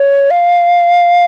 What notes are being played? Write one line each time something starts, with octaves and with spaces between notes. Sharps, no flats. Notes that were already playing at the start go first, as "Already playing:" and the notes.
Already playing: C#5
F5